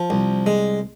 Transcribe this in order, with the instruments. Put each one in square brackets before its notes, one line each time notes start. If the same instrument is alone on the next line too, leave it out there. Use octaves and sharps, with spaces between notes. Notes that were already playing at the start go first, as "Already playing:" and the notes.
Already playing: [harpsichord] F3
C2
G#3